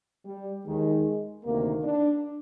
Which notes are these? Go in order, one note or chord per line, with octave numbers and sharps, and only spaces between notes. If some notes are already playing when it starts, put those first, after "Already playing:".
G3
D#2 D#3 G#3
D2 C3 D#3 A#3
D4